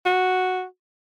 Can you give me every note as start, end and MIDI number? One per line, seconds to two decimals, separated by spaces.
0.06 0.64 66